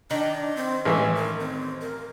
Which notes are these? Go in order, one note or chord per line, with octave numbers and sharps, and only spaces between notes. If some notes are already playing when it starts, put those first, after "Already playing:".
D#3 D4
C4
A1 E3 G#3 E5
A#4
C4
A#4